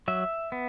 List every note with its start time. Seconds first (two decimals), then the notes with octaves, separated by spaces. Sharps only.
0.08 F#3 E5
0.52 B3